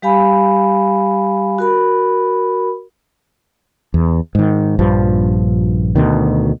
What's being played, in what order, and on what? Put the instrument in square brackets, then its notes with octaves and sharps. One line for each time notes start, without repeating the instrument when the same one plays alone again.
[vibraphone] G3 G4 F5 G#5 B5
F#4 A#4 B5
[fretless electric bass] E2
G#2 D#3
A#1 G2 F3
D2 B2 D#3